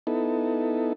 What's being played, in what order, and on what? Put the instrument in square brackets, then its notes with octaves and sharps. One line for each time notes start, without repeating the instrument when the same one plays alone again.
[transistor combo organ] B3 D#4 E4 A4